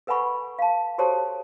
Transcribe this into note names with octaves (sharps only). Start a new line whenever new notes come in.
A4 B4 F#5 G#5 B5 C#6
F5 A5
F#4 G4 A4 C5 C#5 A5